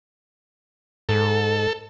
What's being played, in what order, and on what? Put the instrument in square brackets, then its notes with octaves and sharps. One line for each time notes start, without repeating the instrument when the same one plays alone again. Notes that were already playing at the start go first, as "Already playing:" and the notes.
[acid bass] G#2 [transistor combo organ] A4